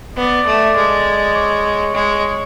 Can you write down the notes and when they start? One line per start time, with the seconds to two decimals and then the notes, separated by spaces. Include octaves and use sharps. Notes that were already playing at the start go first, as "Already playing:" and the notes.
0.16 B3 D5
0.46 A3
0.76 G#3
1.36 C#5
1.95 G#3